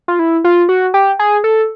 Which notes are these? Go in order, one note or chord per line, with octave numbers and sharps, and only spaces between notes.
F4
E4
F4
F#4
G4
G#4
A4